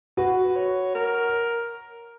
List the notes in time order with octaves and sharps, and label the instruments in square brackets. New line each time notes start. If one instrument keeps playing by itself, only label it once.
[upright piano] F#4 [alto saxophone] B4
[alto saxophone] C#5
A#4